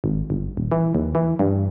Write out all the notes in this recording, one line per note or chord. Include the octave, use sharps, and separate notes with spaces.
G#1
G1
D#1
E3
D#2
E3
G2